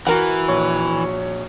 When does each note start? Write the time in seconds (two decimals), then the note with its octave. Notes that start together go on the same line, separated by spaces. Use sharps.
0.07 E3 F#4 A#4 F#5
0.48 A#1 C#5 C#6